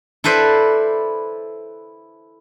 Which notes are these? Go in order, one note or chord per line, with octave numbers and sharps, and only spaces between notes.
E4 A4 B4 C5 D5